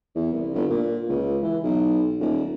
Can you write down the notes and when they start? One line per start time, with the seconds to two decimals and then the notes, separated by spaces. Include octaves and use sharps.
0.15 E2
0.33 C2
0.54 G1
0.70 A#2
1.09 C#2
1.43 E3
1.63 B1
2.20 D#1